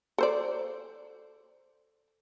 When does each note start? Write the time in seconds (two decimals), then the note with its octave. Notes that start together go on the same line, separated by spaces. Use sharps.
0.18 A4 C5 D5